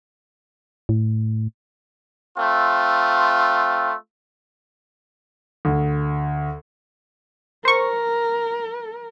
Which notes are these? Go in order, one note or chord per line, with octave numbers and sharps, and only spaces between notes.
A2
A3 C4 F4
D2
A#4 C5 C#6